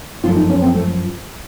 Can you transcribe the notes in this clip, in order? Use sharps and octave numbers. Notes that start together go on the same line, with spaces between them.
F#2 F3 A3 F4
D#4
C#4
C4
A3